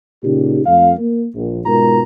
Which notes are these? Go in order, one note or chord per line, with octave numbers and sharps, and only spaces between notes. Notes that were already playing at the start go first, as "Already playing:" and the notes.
A#2 C#3 D#4 G4
F2 A3 F5
A#3
A#1
G#2 B2 G#3 F4 A#4 A#5